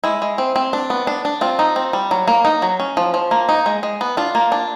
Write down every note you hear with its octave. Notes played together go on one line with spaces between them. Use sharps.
G#3 E4
G#3
C4
C4
D4
B3
D4
D4
C4 F4
D#4
C4
G3
F#3
A#3
D#4
F#3
C#4
F3
F3
A#3
D#4
G#3
G#3
B3
D4 F4
A#3
D4